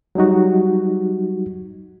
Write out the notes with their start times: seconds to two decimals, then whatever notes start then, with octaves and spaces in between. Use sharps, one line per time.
0.15 F#3 G3 D#4 F#4